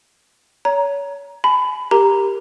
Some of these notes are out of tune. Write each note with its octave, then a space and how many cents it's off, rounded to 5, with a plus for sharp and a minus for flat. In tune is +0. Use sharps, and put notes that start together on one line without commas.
C#5 +30 A#5 +10
G#5 +40 B5 +20
G4 +10 A#4 +0 A#5 +0